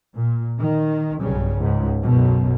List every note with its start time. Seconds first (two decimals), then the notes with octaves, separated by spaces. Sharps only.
0.14 A#2
0.60 D#3
1.21 B1 G2 C#3
1.58 C#2 G#2
2.01 B1 F#2 B2